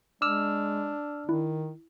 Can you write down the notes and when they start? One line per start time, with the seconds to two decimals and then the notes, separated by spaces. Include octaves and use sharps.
0.22 G#3 D4 D6 E6 F6
1.29 D#3 E4